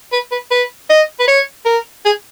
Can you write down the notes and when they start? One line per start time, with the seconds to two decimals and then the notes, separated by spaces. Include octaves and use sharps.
0.13 B4
0.31 B4
0.51 B4
0.90 D#5
1.20 B4
1.28 C#5
1.66 A#4
2.05 G#4